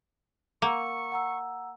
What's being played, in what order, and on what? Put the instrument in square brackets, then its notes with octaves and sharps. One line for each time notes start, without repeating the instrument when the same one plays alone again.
[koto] A#3 [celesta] F#5 A#5 E6 [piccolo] C#6
[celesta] F#5 A#5 E6